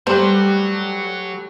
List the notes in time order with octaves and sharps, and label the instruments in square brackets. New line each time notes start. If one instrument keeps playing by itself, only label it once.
[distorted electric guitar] F#3 [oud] G3 [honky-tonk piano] A3 G4 B4 [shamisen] C5